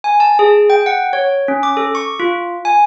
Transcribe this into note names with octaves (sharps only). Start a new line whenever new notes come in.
G#5
A5
G#4
G5
F#5
C#5
C#4
D6
A4
C#6
F4
G#5